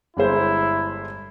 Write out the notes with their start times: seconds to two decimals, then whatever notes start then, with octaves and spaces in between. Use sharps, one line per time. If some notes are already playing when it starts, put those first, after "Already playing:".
0.17 G1 G#3 E4 C5